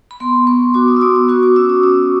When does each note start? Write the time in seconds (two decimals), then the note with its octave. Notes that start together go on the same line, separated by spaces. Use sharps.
0.11 B5
0.20 B3 C6
0.47 B3 C#6
0.74 F#4 D6
0.88 D#6
0.96 E6
1.01 B3 D#6
1.16 D#6
1.29 F#4 C#6
1.43 D6
1.56 C#4 E6
1.69 D#6
1.83 C#4 D#6